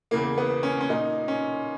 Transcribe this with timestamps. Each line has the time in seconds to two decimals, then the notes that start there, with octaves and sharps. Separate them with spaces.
0.11 E2 C#3 E3 A#3
0.38 B3
0.63 C#4
0.81 C#4
0.90 A#2 D#4
1.28 C#4